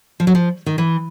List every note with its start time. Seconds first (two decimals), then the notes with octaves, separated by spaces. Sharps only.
0.20 F3
0.27 F#3
0.35 F3
0.66 D#3
0.78 E3